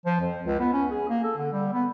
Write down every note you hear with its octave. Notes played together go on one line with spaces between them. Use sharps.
F3
F2
C#2
B3
C#4
G#4
A#3
A4
D3
G3
B3